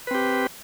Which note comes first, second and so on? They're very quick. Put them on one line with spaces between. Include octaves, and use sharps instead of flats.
B4 C4 G4